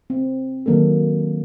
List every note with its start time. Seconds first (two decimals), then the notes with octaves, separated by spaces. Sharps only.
0.10 C4
0.66 D#3 F#3 A#3 D4 A4